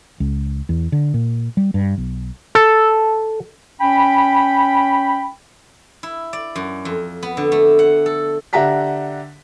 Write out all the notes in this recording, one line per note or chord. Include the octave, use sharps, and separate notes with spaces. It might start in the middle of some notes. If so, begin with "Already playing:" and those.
C#2
E2
D3
A#2
G3
G2
B1
A4
C#4 G5 B5
E4
D5
F#2
F2
B3
D3
A3
F#5
A4
D3 G4 E5 F#5 A#5 B6